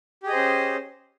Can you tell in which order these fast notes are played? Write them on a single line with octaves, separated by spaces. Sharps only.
G4 G#4 D#5 C5 C#4